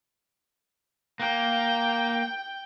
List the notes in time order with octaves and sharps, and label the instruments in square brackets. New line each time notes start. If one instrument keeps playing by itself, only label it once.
[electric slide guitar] A#3 [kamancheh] G5